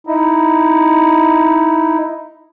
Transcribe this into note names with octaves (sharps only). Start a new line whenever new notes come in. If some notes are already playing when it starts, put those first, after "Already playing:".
D#4 E4